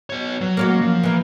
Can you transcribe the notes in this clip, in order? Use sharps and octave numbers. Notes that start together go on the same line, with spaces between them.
B3 C#5
F#3
A#3 C#4 F#4
F3
E3 A#3